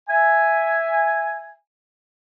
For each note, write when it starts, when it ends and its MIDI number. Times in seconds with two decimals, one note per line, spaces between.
0.09 1.54 76
0.09 1.54 80